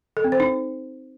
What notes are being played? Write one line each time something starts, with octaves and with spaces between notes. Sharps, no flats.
A4
C4
C5
D#4